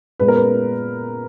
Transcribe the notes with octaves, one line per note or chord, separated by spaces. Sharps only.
A#2 G#3 B3 B4
A#4
B4